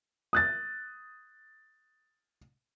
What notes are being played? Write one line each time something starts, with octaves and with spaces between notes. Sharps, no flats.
D#6 F#6 A6